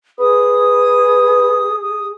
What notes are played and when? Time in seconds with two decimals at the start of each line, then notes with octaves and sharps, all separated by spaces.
0.19 G#4 B4 D#6
1.81 D#6